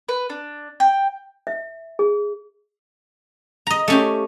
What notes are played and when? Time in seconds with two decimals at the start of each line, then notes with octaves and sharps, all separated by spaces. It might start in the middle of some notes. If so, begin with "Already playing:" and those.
0.09 B4
0.30 D4
0.80 G5
1.47 E5
1.99 G#4
3.67 D#5 A#5
3.88 A3 C#4 G4